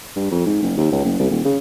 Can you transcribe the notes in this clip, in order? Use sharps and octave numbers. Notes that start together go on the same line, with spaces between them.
G2
F2
G#2
F#1
D#2
C#2
F#1
C2
D#1
C#3